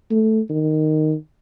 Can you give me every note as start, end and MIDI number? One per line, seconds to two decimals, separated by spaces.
0.11 0.41 57
0.50 1.15 51